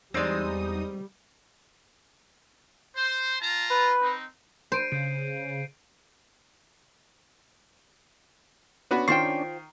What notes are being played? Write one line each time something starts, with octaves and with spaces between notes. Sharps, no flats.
E2 G3 G#3 C4 D#4 C5 D5 D#6
C5
F4 A5 A#5
B4
C4 D#4
C5 C7 D7 D#7
C#3 G6 C7 D7
B3 C#4 D4 F#4 B4
D#3 F4 C5 G5 C#6 C7